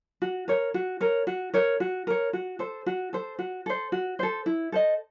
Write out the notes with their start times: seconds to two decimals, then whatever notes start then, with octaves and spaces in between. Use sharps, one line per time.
0.22 F#4
0.48 A#4 C#5
0.74 F#4
1.01 A#4 C#5
1.27 F#4
1.54 A#4 C#5
1.80 F#4
2.07 A#4 C#5
2.33 F#4
2.59 A4 C5
2.86 F#4
3.13 A4 C5
3.39 F#4
3.66 A4 C5
3.92 F#4
4.19 A4 C5
4.46 E4
4.72 A4 C5 D#5